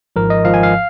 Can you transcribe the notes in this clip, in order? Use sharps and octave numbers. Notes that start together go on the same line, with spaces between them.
G#1 G#2 F3 A#4
D#5
G#1 G#2 F3 F5
G#5
F5